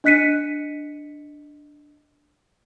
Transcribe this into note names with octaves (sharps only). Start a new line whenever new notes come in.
D4 D#5 F#6 B6 C#7 D#7